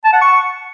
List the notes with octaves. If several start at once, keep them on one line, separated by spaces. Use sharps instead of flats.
A5
F#5
C#6